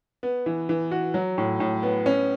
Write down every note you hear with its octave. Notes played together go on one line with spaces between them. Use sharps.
B3
E3
E3
F#4
F#3
A2
A2
B3
C#4